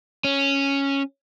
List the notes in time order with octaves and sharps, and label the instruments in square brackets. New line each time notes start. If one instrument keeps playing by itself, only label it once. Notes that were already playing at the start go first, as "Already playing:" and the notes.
[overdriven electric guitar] C#4